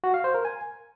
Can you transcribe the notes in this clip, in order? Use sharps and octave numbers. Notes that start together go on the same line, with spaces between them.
F#4
F5
C5
A#4
G#5